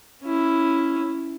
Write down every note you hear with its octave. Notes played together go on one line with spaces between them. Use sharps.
C#4 E4